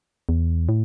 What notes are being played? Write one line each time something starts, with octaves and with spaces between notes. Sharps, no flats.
E2
A2